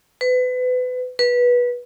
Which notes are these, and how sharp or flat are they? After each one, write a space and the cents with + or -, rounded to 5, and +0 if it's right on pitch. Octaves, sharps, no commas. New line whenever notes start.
B4 +30
B4 -20